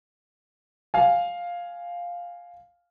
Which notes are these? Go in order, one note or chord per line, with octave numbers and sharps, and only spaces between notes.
F5 G#5